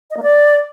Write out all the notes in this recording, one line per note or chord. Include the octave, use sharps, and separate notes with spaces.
D#5
A#3
D5